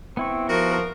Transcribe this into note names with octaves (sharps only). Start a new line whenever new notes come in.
B3 C4 E4 C#6
F3 F#4 A#4